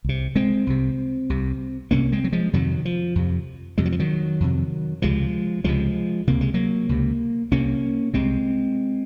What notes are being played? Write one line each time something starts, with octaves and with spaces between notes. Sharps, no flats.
C2 C3
G#3 C4
C2 C3
C2 C3
C2 C3 A#3 C#4
G#3 C4
F#3
F3 G#3
F2 C3 D#3 F#3
F3
F2 C3
F2 C3 G#3
F#3
F3
D#3 F#3
F2 C3
C#2 C3 F3 G#3
C#2 C3 F3 G#3
C#2 C3 A#3
G#3
F#3 A#3
C#2 C3
C2 C3 A#3 C#4
C2 C3 G#3 C4